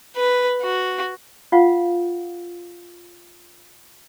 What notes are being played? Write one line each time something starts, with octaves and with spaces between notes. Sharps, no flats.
B4
F#4
F4 F5 F#5